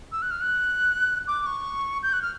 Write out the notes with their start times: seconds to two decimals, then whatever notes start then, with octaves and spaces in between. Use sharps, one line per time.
0.12 E6
0.22 F#6
0.31 F6
0.41 F#6
1.28 D6
1.46 C#6
2.03 G6
2.13 F#6
2.22 F6